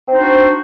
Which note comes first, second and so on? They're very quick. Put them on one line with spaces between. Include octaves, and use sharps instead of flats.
C4 C5 D#4 D4 F#4